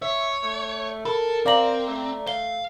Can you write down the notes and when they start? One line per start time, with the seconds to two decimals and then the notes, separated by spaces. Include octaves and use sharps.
0.02 C#5 E5
0.43 A3
1.05 A4 A#4 B5
1.46 C4 D5 F5 A#5 F#7
1.87 A3
2.27 F5 G7